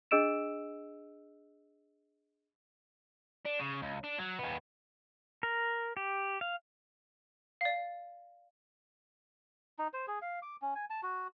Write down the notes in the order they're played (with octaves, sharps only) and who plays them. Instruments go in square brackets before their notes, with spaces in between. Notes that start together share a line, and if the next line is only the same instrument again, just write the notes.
[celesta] D4 G#4 D#5 E6 D7 E7
[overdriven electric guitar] D4
C#3
C#2
D4
F#3
D#2 B3
[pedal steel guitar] A#4
G4
F5
[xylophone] D5 F5
[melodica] D#4
C5
G#4
F5
D6
C#4
G#5
A5
F#4